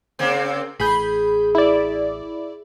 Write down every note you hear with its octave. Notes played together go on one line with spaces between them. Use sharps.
C#3 A#3 C4
A1 G#4 B5 G6
E4 D5